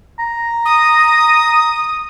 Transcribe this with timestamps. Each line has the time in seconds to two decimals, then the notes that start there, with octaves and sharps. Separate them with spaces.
0.19 A#5
0.65 D#6